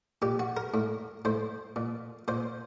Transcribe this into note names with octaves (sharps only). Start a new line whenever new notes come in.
A#2 G4
F#4
A#4
A2
A2 C5
A#2
A#2 C5